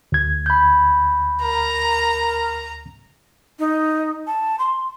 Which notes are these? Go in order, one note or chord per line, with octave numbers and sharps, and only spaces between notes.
D2 G#6
B5 G6
A#4 A#5
D#4
A5
C6